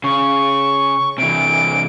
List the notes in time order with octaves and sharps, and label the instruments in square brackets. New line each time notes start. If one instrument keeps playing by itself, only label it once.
[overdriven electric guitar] C#3 [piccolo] C#6
[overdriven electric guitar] C3 E3 [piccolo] D7